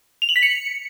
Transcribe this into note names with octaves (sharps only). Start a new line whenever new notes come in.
F7
F#7
B6
C#7